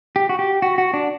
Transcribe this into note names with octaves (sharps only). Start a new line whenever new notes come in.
G4
F#4
G4
F#4
F#4
D4